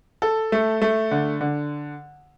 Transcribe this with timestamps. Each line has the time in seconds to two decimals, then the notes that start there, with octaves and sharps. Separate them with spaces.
0.22 A4
0.52 A3
0.82 A3
1.11 D3
1.41 D3